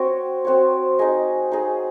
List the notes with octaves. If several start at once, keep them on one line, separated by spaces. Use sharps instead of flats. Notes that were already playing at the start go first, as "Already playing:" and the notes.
Already playing: C4 F#4 C#5
C4 F#4 C#5
D#4 G#4 D#5
D#4 G#4 D#5